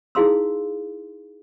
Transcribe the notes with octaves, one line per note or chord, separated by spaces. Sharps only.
D#4 E4 G#4 F5 C6 E6